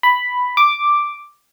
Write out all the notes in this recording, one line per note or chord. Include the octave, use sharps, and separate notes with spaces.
B5
D6